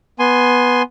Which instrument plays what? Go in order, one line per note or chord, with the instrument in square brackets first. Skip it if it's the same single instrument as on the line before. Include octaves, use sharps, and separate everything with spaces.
[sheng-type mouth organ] B3 G#5 C6